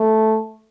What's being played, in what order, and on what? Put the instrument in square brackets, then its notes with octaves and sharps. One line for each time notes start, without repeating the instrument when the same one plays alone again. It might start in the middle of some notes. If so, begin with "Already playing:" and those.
Already playing: [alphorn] A3